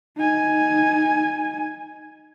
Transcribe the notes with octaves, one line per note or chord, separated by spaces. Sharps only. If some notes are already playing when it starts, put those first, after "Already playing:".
D#4 G#5